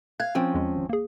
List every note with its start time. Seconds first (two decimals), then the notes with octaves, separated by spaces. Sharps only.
0.20 F5 F#6 G#6
0.35 F3 C4 C#4 G5
0.54 E2 G#3
0.76 G#1
0.89 A#3 G#4